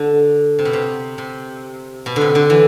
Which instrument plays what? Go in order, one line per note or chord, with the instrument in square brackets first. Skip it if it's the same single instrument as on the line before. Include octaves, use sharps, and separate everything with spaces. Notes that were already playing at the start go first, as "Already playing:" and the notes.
Already playing: [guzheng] D3
C3
B2
C3
C3
B2
D3
C3
D3
E3